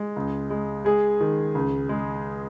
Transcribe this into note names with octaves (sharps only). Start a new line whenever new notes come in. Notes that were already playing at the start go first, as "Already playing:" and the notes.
Already playing: G#3
C#2
G#3
G#3 G#4
D#3
C#2
G#3